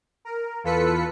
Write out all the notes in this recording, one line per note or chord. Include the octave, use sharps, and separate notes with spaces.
A#4
E2 F4 A4 B4 B6 C#7